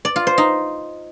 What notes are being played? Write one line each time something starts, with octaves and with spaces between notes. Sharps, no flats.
D5
F4
C5
D#4